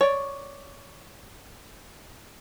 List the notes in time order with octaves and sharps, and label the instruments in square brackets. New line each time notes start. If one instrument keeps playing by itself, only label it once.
[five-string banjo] C#5 D5